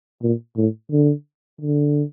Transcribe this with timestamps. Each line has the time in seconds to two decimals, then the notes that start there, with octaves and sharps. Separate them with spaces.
0.22 A#2
0.57 A2
0.91 D3
1.61 D3